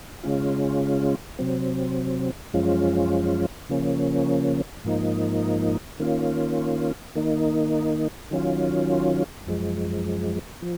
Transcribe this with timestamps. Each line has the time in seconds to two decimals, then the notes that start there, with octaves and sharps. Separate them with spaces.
0.23 C#3 G#3 C#4 F4
1.39 C3 F#3 C4
2.54 F#2 F3 G#3 C#4 F4
3.69 C#3 F3 A#3 C#4
4.84 G#2 F3 A#3 D#4
6.00 D#3 A#3 C#4 F4
7.15 D#3 A#3 D#4
8.31 D#3 F#3 C#4 F4
9.47 F#2 F3 G#3
10.62 F3